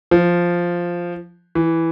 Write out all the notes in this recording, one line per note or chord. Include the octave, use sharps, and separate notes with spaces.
F3
E3